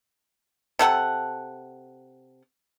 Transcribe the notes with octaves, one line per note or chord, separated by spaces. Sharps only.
C3 A4 F#5